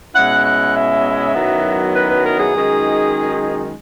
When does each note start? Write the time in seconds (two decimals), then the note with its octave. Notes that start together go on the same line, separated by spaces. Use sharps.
0.14 B2 G#3 C#4 E4 F#5
0.45 F#5
0.75 E5
1.35 F#2 D#3 F#3 B3 E4
1.95 B4
2.10 B4
2.25 A#4
2.39 G#4
2.54 F#2 D#3 G#3 D#4